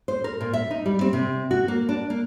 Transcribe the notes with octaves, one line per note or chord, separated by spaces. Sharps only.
C5
A#4
A#2
E5
D#4
G3
C4
C3
F#4
A#3
D4
A#3